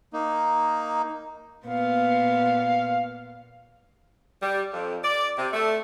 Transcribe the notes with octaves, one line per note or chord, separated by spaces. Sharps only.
A#3 D#4
A#2 B3 F5
G3
F2
D5
C3
A3